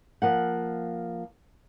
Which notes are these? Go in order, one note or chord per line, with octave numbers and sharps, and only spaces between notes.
F3 A#3 F#5